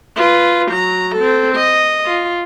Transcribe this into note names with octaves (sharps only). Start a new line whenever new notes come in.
F4 B4
F#3 A#5
C4 A4
D#5
F4